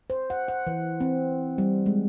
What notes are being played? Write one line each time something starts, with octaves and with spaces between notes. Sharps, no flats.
C5
F#5
F#5
E3
C4
G3
G#3